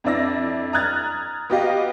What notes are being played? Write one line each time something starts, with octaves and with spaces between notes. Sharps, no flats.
F2 D4 E4 D5 E6 A#6
A#5 D#6 F6 F#6 G#6 A6
B3 F#4 G4 B4 D#5 F5